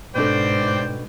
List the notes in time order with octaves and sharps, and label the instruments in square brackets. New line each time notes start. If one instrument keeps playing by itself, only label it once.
[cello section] G#2 [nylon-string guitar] B2 D4 A4 [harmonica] C5 D5 G5